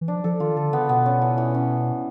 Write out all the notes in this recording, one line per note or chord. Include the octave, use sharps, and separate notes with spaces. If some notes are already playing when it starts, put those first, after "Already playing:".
E3
F3 D4
F3 A4
D#3 F4
D3 A4
C#3 B3
B2 B3
C#4
E3
E3
C#4